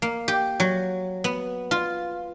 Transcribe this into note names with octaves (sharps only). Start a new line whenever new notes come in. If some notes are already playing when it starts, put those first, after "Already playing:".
A#3
G4
F#3
B3
F4